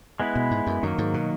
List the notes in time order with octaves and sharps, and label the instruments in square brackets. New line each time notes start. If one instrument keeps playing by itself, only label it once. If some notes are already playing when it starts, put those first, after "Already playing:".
[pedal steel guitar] G#3 B3 E4 B4
[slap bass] B2
G#2
F#2
[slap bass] F#2 [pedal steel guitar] D#3 F#3 A#3
[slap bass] G#2
B2